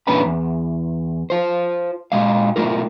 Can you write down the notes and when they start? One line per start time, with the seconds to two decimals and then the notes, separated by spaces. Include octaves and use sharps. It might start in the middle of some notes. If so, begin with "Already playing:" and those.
0.07 E2 A#2 C#4 D4 B4 B5
0.26 E2
1.30 F4 C5
2.12 A#2 G#3 F5
2.56 B1 G2 A3 F4 A#4